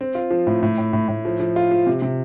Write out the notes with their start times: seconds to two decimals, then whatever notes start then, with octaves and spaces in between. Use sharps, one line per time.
0.01 C4
0.15 F4
0.31 F3
0.47 A2
0.63 A2
0.78 A2
0.93 A2
1.08 A2
1.25 F3
1.40 F3
1.56 F4
1.71 F3
1.87 C3
2.02 C3